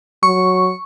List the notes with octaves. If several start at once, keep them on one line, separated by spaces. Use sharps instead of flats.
F#3 C#6